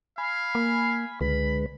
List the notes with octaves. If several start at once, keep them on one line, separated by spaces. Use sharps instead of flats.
F5 G#5 B5
A#3
C#2 D3 G#3 B4 B5